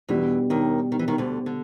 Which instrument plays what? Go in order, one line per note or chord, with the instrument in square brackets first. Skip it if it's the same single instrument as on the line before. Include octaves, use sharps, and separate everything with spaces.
[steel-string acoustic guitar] E2 E3 [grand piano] B2 G3 B3 D4
[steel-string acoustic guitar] D#2 D#3
D#3
E3
D#2 D#3
D2 D3
D3